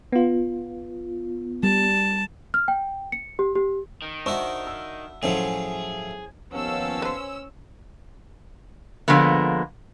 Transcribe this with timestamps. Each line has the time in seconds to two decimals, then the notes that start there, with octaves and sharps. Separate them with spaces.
0.12 B3 F4
1.63 G3 A5
2.54 F6
2.68 G5
3.12 C#7
3.39 G4
3.55 G4
4.02 D#3
4.26 D4 E4 F#4 C5 C#6
4.67 E6
5.23 A2 F3 F#3 C#4 E4 G#4 C5
6.52 D#2 F3 B3 C#4 F5 G5 A5 E6
7.02 B4 C5
9.08 D3 F3 G#3 A#3 B3